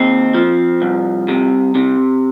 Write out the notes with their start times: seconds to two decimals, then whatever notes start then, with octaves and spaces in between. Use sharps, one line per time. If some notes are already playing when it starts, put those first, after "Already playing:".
Already playing: D#2 C4
0.34 F3
0.82 C2
1.28 C3
1.75 C3